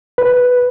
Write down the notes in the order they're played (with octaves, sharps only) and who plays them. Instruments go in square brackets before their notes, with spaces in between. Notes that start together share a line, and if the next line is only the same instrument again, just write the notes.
[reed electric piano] B4